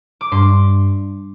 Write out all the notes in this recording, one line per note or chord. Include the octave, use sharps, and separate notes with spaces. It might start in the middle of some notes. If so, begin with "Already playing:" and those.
D6
G2 C6